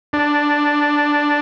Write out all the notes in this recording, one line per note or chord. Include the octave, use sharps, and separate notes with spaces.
D4